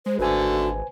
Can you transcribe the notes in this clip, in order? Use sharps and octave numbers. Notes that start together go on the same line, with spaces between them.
G#3 C5
G#1 D3 A3 F#4 B4 C5 G#5